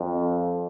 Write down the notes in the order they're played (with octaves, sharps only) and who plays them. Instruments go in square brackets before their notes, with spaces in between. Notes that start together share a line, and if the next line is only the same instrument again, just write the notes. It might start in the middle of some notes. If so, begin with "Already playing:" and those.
Already playing: [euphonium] F2